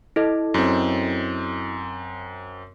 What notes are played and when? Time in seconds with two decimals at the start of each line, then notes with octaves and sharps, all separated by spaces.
0.16 E4 A4 D#5
0.54 F#2 C4